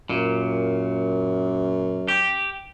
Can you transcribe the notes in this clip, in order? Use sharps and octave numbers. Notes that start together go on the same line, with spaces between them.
F#2 A#2
G4